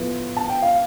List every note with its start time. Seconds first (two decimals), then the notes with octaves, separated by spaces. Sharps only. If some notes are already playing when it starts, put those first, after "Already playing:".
Already playing: A2 F3 B3
0.37 A5
0.49 G5
0.62 F5